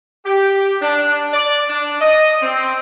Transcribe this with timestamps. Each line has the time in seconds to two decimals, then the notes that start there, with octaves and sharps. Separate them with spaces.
0.26 G4
0.82 D4
1.33 D5
1.68 D4
2.00 D#5
2.42 C4